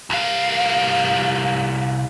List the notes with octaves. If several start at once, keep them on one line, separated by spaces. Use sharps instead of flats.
C2 F5